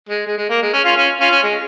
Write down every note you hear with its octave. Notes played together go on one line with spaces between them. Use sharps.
G#3
G#3
G#3
A#3
G#3
C#4
C#4 F4
C#4 F4
C#4 F4
C#4
G#3